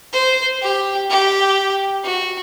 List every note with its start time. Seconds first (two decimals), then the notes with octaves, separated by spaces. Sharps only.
0.13 C5
0.62 G4
1.10 G4
2.04 F#4